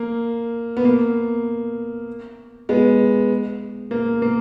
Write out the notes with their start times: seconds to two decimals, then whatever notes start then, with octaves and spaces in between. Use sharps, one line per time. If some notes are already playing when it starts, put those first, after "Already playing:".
Already playing: A#3
0.77 B3
0.85 A#3
2.69 G#3 B3
3.91 A#3
4.22 A#3